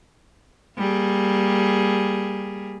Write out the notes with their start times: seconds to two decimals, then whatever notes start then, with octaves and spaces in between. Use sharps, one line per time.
0.78 G3 A#3 G#4